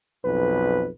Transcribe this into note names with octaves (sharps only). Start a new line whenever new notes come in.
B1 F2 B4